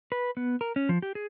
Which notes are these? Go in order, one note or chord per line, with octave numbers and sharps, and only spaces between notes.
B4
B3
A#4
C#4
F3
G4
G#4